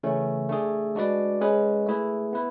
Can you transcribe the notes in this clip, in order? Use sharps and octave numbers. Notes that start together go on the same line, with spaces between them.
C#3 E3 A3 C#4
A3 D4 G#4
G#3 D4 F#4 B4 D5
G#3 C#4 G#4 B4
A3 E4 G#4 B4
B3 E4 B4